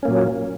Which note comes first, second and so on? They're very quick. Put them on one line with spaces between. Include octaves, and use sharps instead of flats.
C#4 A#3 A#2 F#3